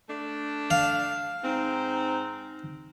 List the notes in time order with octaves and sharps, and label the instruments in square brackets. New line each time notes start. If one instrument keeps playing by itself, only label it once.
[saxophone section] A3 D4
[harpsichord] F5
[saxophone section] G#2 C4 [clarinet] D#4